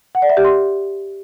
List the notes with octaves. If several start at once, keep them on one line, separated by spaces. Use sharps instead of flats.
F#5
D5
E5
G4
C6